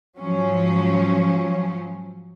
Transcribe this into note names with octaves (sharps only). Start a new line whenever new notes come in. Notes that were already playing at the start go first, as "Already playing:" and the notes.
G#2 F3 F#3 C#4